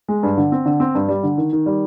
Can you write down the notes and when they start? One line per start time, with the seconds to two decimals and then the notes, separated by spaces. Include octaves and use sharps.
0.08 G#3
0.23 G2
0.37 D3
0.52 C4
0.66 D3
0.80 C4
0.95 G2
1.08 G3
1.23 D3
1.38 D#3
1.53 D#3
1.66 G3